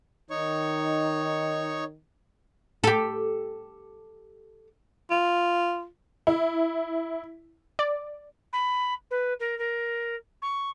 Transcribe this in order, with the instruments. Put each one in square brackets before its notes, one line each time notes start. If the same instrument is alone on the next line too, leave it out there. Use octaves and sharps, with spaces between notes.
[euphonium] D#3 [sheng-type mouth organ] D#4 C#5 C#6
[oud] G4 A4
[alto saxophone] F4
[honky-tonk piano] E4
[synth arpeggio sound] D5
[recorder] B5
B4
A#4
A#4
C#6